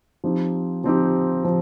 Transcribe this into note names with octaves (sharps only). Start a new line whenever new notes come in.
F3 C4 D#4 G4
F3 C4 D#4 G4
F3 C4